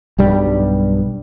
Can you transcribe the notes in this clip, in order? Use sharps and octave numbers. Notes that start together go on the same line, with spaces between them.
B1 G2 G3